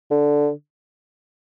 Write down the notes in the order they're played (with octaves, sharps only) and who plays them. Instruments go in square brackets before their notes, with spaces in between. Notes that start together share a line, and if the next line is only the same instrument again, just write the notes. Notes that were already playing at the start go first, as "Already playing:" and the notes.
[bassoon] D3